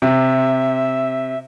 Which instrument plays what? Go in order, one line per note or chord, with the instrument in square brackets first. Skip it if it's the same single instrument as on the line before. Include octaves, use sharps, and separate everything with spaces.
[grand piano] C3 [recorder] E5